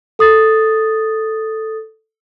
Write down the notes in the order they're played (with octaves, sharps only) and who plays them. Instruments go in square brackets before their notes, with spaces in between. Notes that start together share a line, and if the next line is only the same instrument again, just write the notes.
[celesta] A4 D#6 A6